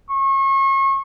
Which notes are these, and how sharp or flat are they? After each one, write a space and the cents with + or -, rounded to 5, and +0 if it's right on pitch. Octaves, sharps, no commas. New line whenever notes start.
C#6 -35